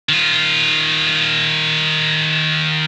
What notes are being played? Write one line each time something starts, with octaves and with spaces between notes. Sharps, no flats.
D#3 F4